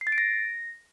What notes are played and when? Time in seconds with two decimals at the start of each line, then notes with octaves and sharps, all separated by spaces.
0.01 C7
0.07 A6
0.12 D7
0.18 A#6